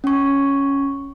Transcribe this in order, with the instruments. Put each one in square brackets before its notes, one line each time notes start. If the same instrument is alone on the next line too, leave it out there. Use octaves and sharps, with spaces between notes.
[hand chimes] C#4 C#6